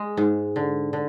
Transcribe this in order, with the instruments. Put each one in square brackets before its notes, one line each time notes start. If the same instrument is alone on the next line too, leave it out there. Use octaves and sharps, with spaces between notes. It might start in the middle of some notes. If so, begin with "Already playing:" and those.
Already playing: [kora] G#3
G#2
D3
D3